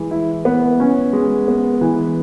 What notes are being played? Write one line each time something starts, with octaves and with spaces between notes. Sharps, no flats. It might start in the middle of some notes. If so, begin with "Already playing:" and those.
Already playing: E3 G#3
E4
B3
C#4
G#3
B3
E3